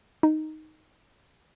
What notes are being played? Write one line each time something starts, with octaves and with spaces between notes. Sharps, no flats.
D#4